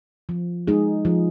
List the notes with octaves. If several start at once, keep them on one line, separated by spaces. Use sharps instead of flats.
F3
G#3 D#4 G#4
F3